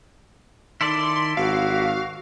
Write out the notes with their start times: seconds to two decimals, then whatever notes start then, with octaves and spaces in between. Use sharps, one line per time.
0.81 D#3 E4 A4 D5 C6
1.37 G#1 F#4 F5